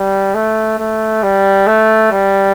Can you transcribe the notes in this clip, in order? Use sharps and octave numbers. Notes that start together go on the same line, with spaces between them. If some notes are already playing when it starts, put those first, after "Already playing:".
Already playing: G3
A3
A3
G3
A3
G3